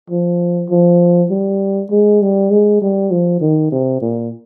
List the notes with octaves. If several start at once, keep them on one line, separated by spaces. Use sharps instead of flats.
F3
F3
G3
G#3
G3
G#3
G3
F3
D#3
C3
A#2